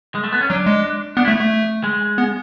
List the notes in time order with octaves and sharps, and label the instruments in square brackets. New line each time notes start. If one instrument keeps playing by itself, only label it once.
[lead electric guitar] G#3
A3
B3
C#4
[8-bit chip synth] F#3 [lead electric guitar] D4
[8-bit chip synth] G#3
[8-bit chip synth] B3 [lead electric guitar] D4
[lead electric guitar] E4
[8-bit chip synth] A3
A3
[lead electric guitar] G#3
[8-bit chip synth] B3